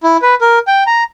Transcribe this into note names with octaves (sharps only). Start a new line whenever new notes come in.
E4
B4
A#4
G5
A#5